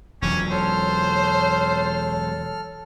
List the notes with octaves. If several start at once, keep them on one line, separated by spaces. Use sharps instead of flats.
E1 E3 F#3 C#4 G#5 D6
A4 C5 C#5 F6